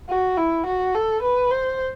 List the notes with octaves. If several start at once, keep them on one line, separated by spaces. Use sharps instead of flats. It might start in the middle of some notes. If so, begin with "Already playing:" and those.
F#4
E4
F#4
A4
B4
C5